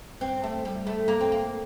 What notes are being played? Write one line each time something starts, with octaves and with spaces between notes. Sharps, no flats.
C4
A3
G3
A3
A#3
C4
A#3